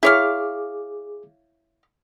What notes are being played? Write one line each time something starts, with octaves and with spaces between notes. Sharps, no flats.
E4 G#4 C#5 F5 D6